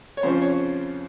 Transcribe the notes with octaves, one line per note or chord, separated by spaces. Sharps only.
C#5
F2 C#3 F3 C5
C#5